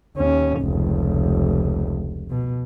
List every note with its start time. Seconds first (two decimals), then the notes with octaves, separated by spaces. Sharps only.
0.16 D#2 C#4
0.61 F1 C#2
2.30 B2